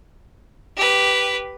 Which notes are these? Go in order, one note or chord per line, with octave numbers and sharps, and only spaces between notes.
G4 B4